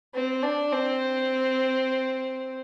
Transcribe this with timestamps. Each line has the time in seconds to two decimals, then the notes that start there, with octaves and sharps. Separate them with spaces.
0.14 C4
0.43 D4
0.72 C4